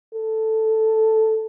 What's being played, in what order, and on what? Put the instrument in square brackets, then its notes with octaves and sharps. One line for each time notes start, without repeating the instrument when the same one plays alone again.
[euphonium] A4